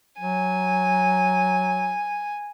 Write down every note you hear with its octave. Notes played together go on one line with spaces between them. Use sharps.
F#3 G#5